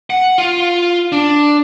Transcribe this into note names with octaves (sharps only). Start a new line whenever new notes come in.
F#5
F4
D4